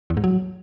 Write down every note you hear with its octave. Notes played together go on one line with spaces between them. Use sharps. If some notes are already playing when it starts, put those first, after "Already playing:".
E2
G#2
F#3